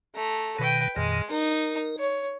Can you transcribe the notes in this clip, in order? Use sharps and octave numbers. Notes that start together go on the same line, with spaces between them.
A3 A#5
B2 D#3 B4 G5
F2 A#2 D#3 G#3
D#4 A#4
C#5